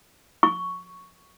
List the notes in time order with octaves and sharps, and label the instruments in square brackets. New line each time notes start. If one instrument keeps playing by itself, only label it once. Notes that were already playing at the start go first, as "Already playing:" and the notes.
[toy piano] C#6